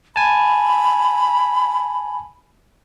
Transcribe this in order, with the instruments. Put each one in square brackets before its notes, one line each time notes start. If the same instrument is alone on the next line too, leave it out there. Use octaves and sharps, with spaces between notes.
[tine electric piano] G#5 A5 [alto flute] B5